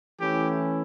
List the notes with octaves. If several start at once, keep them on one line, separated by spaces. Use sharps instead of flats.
E3 A3 C#4 E4 G4